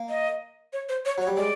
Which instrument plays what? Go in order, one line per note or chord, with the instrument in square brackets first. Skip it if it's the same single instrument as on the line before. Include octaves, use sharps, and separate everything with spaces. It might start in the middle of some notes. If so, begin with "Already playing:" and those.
Already playing: [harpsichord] A#3
[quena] D#5
C#5
C5
C#5
[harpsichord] F#3 [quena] C#5
[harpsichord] G3
[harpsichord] G#3 [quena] D5